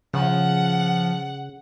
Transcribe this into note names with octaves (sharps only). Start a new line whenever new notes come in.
C#3 F3 F#5